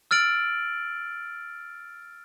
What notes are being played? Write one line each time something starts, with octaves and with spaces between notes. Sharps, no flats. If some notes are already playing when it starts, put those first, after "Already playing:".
E6 F6 A6 D7 F#7